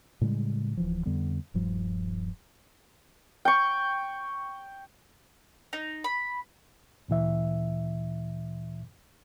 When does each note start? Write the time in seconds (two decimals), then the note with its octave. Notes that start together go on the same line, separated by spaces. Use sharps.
0.21 A2 C#3 G3 G#3
0.77 D1 E3 F3
1.06 F2 D3 G3 B3
1.54 D#1 G2 F3 G3
3.45 G5 C#6
5.73 D#4
6.04 B5
7.08 D2 A#2 E3 E5